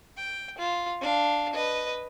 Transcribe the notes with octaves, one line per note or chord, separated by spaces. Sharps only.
G5
F4
D4 F5
B4 D#5